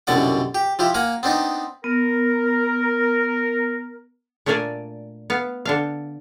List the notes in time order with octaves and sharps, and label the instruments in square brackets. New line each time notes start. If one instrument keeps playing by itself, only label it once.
[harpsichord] C2 F#2 B2 D3 D5 F#5
G4
F3 E4 G4
A#3 A#4 F#5 G#5
B3 C4 D4 D#4
[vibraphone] B3 [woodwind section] A#4
[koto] A#2 A3 D4 A#4 D5 G#5
B3 F5
D3 D4 F5